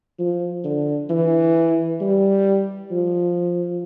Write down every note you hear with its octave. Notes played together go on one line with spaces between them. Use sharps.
F3
D3
E3
G3
F3